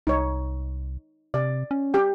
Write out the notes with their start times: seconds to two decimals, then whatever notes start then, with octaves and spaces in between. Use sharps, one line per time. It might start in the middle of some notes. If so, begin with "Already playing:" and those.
0.07 C2 D#4 C#5
1.34 C3 D5
1.71 C#4
1.94 G4 G5